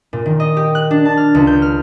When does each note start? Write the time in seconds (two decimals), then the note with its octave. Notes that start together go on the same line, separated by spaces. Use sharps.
0.13 A#2
0.26 D#3
0.40 D#5
0.57 G4
0.75 F#6
0.91 D4
1.05 A5
1.17 F6
1.35 C#2
1.47 G6
1.62 F6